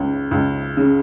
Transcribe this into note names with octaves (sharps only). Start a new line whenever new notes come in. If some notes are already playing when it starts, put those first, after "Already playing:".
Already playing: C#2 C#3
C#2
C#3